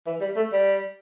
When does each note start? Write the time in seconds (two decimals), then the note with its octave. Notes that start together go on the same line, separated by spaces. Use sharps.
0.06 E3
0.21 G3
0.36 A3
0.52 G3